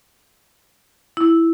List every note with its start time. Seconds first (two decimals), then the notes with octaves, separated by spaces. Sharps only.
1.17 E4